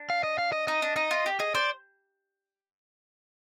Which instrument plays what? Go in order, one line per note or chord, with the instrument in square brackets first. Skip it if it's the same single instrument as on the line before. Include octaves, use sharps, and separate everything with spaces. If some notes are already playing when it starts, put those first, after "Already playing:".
Already playing: [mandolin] D4
[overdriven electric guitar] F5
D#5
F5
D#5
[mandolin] D#4 [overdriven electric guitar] D#5
[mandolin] D4
[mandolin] D#4 [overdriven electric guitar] D#5
[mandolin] F4
G4
[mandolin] G#4 [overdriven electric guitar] D#5
[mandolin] C5 [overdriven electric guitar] D5